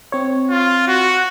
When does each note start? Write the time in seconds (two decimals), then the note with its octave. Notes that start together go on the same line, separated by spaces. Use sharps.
0.12 C4 C#5
0.50 F4
0.88 F#4